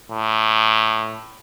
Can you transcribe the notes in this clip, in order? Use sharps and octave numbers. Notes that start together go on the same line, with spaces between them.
A2